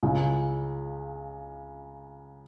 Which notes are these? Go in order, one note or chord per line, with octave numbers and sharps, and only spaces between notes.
C#2 C#3